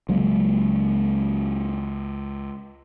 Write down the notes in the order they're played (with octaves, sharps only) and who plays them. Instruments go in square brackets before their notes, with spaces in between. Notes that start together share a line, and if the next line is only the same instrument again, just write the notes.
[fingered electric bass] C#2 F#3 G#3 A#3